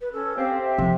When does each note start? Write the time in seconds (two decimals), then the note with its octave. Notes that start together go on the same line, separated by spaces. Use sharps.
0.01 B4
0.13 C#4 A4
0.37 C4 G4 F5
0.64 E5
0.78 C3 F3